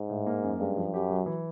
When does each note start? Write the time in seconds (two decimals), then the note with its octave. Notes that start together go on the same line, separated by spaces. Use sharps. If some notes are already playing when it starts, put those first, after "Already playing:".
Already playing: G#2
0.09 A2
0.26 A#3
0.43 F#2
0.59 G2 G#3
0.77 F3
0.93 F#2 G4
1.10 F#3
1.26 E3